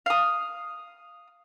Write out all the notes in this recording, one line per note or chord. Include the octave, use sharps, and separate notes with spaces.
F5 D#6